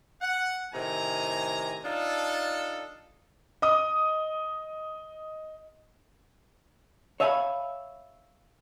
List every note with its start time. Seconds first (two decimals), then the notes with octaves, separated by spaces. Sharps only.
0.22 F#5
0.73 A2 C3 D#3 G#5 A#5
1.83 D4 D#4 F4 A4
3.62 D#5 D#6
7.20 C#5 E5 F5 G#5 A5 B5